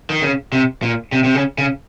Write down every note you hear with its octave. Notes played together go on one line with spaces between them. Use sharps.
D#3
C#3
C3
A#2
C3
C3
C#3
C#3